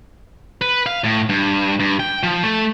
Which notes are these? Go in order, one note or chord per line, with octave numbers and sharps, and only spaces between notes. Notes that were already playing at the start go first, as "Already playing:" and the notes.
B4
F5
A2
G2
G2
G5
F3
A3